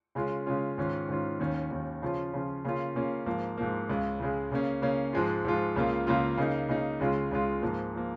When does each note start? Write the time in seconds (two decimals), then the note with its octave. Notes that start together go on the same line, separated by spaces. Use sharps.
0.15 C#3 G#3 C#4 F4
0.46 C#3 G#3 C#4 F4
0.78 G#2 D#3 C#4 F4
1.09 G#2 D#3 C#4 F4
1.39 D#2 D#3 C#4
1.71 D#2 D#3 C#4
2.02 C#3 F3 C#4 F4
2.33 C#3 F3 C#4 F4
2.65 C#3 A#3 C#4 F4
2.95 C#3 A#3 C#4 F4
3.26 G#2 F3 A#3
3.57 G#2 F3 A#3
3.89 C#2 C#3 G#3
4.20 C#2 C#3 G#3
4.52 C#3 A#3 C#4
4.82 C#3 A#3 C#4
5.13 G#2 F3 G#3 F4
5.44 G#2 F3 G#3 F4
5.76 C#2 C#3 A#3 F4
6.07 C#2 C#3 A#3 F4
6.38 C#3 A#3 D#4
6.69 C#3 A#3 D#4
7.00 C#2 C#3 G#3 F4
7.31 C#2 C#3 G#3 F4
7.62 G#2 F3 A#3
7.95 F3 A#3